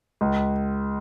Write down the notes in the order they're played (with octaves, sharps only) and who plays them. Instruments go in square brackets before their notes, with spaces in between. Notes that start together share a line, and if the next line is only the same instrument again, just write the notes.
[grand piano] C#2